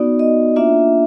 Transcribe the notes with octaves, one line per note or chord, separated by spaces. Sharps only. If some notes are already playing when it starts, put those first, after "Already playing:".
Already playing: B3 D#4 F#4 D5
D#5
A#3 D4 F4 E5